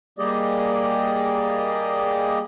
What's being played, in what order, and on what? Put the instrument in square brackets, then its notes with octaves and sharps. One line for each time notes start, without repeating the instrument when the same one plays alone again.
[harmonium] G3 A#3 G4 G#4 D5 D#5